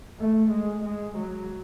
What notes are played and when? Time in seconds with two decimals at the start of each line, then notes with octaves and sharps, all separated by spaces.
0.19 A3
0.52 G#3
0.85 G#3
1.19 F#3